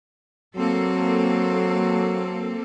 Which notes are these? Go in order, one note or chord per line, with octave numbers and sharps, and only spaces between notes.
F#3 A#3 C4 A4